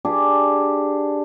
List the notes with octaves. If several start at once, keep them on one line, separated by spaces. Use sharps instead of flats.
D4 G4 G#4